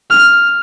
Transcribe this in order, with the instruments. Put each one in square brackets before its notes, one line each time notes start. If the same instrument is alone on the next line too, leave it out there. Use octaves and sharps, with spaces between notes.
[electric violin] F6